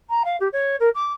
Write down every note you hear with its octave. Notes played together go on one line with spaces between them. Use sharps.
A#5
F5
G4
C#5
A#4
D6